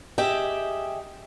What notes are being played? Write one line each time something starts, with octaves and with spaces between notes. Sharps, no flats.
G4 G#4 D#5 E5 G5